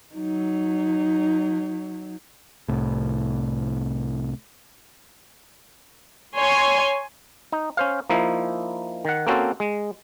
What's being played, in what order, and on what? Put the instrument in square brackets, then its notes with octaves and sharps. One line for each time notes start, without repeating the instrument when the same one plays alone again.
[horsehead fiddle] F#3 D#4
[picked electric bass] C2 A2
[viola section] C#5 G#5 C6
[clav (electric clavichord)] D#4
C#4 C5 F5
F3 A#3 D#4 E4
D#3 F#5
A#3 C4 C#4 F#4 A4 C5
G#3